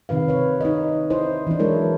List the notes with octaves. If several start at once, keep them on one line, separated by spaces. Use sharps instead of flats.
C3 D#3 B4 F5
B4 C#5
D#4 D#5
E4 C5 D#5
E3 D4
F#3 G#3 E4 A#4 C#5